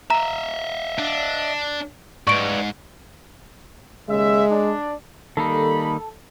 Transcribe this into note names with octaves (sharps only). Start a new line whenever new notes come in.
D#5 E5 A#5
D4
G#2 B4 D5 C#6 D7
D#2 C#3 G#3 E5
D4
D#3 G3 A#3 D#4 A4 B5